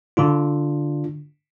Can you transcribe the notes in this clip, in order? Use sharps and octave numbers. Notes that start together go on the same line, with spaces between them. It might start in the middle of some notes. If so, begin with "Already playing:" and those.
D3 D4 F4